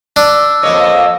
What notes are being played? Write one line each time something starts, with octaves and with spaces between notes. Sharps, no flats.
D4 E6
F2 A#3 C#5 D#5